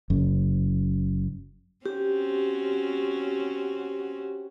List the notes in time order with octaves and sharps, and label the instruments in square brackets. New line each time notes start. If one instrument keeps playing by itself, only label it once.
[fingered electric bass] F#1 F#2
[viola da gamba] C4 C#4 F#4 [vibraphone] G4